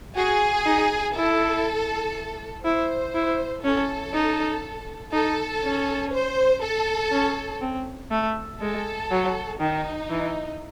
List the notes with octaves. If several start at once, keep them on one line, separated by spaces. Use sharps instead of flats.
F#4 G#4
D#4
E4 A4
E4 C5
E4
C#4 A4
D#4
D#4 A4
C#4
C5
A4
C#4
C4
A3
G#3 A4
F#3
D#3 D#4
E3